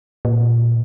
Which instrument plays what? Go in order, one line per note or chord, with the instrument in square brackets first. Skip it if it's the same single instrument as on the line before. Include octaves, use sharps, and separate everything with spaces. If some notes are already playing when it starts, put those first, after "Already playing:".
[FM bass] A#2